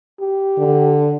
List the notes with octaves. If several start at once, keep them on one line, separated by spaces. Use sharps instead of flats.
G4
D3